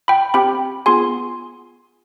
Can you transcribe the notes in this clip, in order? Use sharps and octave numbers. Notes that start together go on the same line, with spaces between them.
G5 B5
C4 G4 G5 B5
B3 F4 G#4 G#5 C6